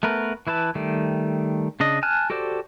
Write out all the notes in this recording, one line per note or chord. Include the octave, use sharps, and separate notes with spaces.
A3 B3 A#4 B4
E3 E4 B4 A5
D#3 G3 A3
C#3 D4 D#5
G#5 A5 F6 F#6
F#4 G4 A4 C5 D5